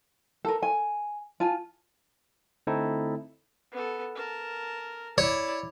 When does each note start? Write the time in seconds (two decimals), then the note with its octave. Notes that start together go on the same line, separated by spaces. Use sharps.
0.45 A4 A#4
0.63 G#5
1.40 F4 G#5 A5
2.67 D3 A3 C4 D#4 E4 A4
3.72 B3 A4
4.15 A#4 A5
5.18 E4 C#5 D5